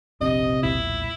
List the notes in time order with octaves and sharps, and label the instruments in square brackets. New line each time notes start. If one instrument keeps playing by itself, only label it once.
[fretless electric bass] F1 A#1 D4 [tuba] C3 [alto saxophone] D#5
[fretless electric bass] E1 B1 A#2 [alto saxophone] E4